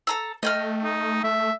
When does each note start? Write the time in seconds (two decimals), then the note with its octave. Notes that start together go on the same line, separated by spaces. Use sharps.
0.07 A4 A#5 E6
0.43 A3 D#5 G5 F6
0.84 D#4
1.24 A3 E5